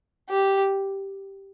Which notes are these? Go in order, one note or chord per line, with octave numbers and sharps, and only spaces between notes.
G4